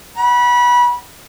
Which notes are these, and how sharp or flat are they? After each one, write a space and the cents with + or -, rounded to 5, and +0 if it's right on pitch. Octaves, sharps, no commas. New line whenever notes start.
F#5 +20 B5 -25